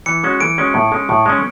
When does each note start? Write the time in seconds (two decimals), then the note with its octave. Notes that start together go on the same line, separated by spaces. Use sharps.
0.06 E3 C#7
0.23 G#3 C#4 F#4
0.40 E3 D7
0.58 G#3 C#4 F#4
0.74 A2
0.92 G#3 C#4
1.09 A2
1.26 G#3 C#4